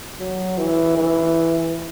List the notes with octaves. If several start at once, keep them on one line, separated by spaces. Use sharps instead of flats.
F#3
E3
E3